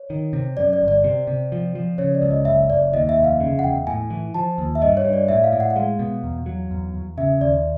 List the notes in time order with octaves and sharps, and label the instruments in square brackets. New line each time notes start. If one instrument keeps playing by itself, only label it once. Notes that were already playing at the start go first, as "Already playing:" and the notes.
Already playing: [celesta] C#5
[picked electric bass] D#3
C3
[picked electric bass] F#2 [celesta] D5
[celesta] D5
[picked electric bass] G1
[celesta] D5
[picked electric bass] C3
C3
F3
F3
[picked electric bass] C#3 [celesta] C#5
[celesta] D5
[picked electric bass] C#2
[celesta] D#5
[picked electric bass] F#1 [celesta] E5
[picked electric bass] F#1 [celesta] D5
[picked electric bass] D#2 [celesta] D#5
[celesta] E5
[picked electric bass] F1
[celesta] F5
[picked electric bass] C#3
[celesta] F#5
[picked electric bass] E2 [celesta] G5
[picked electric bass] A2 [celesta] G#5
[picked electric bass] E3
[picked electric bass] F3 [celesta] A5
[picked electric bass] D#2
[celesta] E5
[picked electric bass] G2 [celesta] D#5
[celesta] C#5
[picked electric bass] G2
[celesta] D5
[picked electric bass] A2 [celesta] E5
[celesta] F5
[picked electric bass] A2
[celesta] F#5
F#5
[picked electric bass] G#3 [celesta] F5
[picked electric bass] B2
E2
F#3
E2
E2
[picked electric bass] C#3 [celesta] E5
[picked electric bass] D#2 [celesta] D5